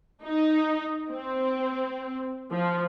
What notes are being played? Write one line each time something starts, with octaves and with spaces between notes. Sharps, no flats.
D#4
C4
F3